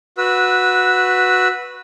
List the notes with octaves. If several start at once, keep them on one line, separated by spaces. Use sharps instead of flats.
F#4 B4 E6